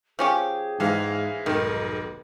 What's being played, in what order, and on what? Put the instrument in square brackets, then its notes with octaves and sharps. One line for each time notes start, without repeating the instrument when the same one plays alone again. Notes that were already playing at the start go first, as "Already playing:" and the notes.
[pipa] F3 C#4 G4 [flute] G#4
[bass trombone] G#2 [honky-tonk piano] E3 G#3 F5
[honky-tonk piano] F1 G#2 [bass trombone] B1 [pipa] D#3